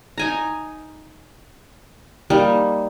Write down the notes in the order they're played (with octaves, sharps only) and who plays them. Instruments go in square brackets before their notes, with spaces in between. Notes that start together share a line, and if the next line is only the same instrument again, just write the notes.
[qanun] D#4 G#5 A#5
G3 A#3 D#4